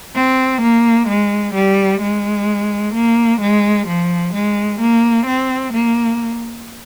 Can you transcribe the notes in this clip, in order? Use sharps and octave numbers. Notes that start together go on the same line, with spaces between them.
C4
A#3
G#3
G3
G#3
A#3
G#3
F3
G#3
A#3
C4
A#3